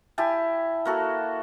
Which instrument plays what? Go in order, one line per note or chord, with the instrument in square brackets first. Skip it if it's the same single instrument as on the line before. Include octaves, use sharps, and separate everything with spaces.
[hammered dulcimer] E4 G4 G#5 A5
A#3 F#4 A4